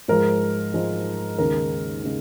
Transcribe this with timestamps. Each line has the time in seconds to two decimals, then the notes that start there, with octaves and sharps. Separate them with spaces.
0.08 G#2 F3 G#3 A#4
0.74 G#2 F3 G#3
1.38 D#2 C#3 G#3 A#4
2.04 C#3 G#3